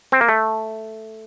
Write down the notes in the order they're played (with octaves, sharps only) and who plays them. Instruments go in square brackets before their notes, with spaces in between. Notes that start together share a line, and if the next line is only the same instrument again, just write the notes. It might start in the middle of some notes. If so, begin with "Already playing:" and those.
[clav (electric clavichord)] C4
A#3
A3